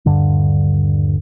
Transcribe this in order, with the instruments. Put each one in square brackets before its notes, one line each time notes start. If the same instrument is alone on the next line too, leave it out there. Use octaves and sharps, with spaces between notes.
[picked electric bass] D#1 G2 D3 G3